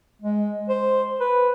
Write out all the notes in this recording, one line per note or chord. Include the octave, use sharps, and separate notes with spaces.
G#3
C5
B4